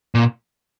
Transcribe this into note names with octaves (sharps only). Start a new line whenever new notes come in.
A#2